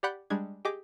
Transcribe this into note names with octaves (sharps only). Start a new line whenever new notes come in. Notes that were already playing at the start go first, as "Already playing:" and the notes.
G4 D5 F#5 B5 F#6 G6
G3 G#3 D4 G#4 G#6
G4 G#4 D#5 D6